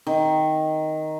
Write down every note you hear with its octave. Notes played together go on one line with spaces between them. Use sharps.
D#3